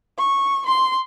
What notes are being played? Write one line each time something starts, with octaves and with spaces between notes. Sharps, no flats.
C#6
C6